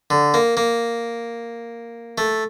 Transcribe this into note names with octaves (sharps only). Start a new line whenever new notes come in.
D3
A#3
A#3
A3